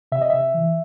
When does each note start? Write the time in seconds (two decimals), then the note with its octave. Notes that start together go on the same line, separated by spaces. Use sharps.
0.12 C3 E5
0.22 D#5
0.30 C3 E5
0.54 E3